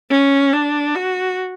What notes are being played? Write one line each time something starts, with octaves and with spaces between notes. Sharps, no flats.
C#4
D4
F#4